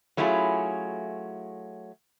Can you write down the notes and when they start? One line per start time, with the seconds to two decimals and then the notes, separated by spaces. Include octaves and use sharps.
0.17 F#3 A3 C#4 E4 F4 G#4